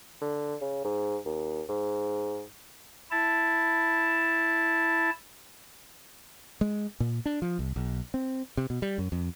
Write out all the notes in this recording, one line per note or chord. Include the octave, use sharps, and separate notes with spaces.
D3
C#3
G#2
D#2
G#2
E4 A5
G#3
A#2
D4
F3
C2
B1
C4
C3
B2
G3
F#2
F2